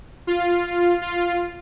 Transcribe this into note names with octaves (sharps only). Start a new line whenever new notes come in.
F4
F4